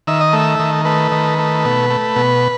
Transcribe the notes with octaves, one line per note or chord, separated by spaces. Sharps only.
D#3 E5
D#5
A3 E5
D#3
A3 B4
D#3
A3
B2
A3
B2